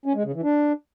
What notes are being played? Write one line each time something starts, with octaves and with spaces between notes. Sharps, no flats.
C#4
G#3
C#3
E3
D4